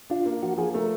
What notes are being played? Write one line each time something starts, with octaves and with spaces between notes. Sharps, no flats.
D4 F4
A#3
F3 F#4
F3 G#4
A3 A#4